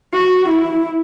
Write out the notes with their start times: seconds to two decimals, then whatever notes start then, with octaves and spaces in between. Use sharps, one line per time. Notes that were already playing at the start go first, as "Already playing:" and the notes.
0.14 F#4
0.49 E4